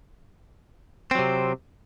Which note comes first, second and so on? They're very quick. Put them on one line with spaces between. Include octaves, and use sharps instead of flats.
C4 F#3 C3